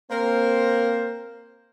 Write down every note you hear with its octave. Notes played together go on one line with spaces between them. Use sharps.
A#3 C4 A#4 C5